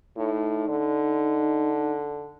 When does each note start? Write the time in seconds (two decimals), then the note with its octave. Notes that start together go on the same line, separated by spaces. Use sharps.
0.17 A2 D#4
0.68 D3